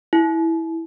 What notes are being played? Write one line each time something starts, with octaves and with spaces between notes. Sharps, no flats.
E4